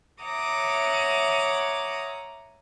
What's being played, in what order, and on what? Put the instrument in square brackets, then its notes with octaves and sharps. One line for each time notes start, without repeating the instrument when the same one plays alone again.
[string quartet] C#5 E5 F#5 A#5 D6 D#6